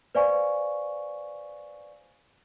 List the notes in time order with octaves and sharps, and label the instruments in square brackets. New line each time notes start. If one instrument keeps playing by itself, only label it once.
[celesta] B4 C5 D5 F5 G#5 C#6